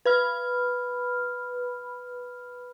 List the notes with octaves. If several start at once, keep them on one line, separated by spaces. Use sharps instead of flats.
B4 B5 F6